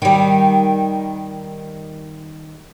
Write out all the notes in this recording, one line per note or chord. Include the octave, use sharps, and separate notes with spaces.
D#3 G3